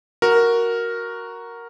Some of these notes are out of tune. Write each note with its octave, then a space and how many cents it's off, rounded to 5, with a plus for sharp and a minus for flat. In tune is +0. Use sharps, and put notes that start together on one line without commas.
F#4 +0 A#4 +0